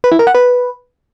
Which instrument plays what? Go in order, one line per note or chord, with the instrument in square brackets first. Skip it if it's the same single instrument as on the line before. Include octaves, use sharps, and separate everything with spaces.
[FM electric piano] B4
E4
A#4
F#5
B4